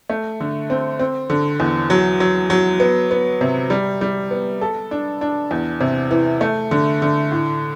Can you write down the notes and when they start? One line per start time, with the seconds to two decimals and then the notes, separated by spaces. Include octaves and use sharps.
0.10 A3
0.40 D3
0.70 C4
0.99 C4
1.30 D3
1.60 E2
1.90 F#3
2.20 F#3
2.50 F#3
2.80 B3
3.11 B3
3.41 C3
3.70 G3
4.01 G3
4.31 B3
4.61 A4
4.91 D4
5.21 D4
5.51 E2
5.81 C3
6.11 E3
6.41 A3
6.71 D3
7.02 D3
7.32 A2